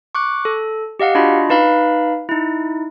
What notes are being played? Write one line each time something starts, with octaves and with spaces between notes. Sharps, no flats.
C#6 D6 F#6
A4
G4 D#5 F5 F#5
D4 F4 F#4 D#5 B5
D#4 B4 F5 B5
D#4 E4